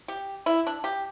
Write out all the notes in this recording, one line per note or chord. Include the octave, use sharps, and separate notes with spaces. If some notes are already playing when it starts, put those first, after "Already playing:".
G4
E4
D4
G4